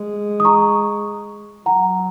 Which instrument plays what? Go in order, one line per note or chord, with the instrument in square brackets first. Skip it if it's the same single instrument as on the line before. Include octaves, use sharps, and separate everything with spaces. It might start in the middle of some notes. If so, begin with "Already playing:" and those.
Already playing: [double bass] G#3
[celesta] D#6
A#5 C#6
[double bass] F#3 [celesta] F#5 A#5